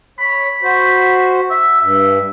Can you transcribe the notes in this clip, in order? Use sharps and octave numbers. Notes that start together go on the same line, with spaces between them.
C#5 B5
F#4 C5
E5
G2 E5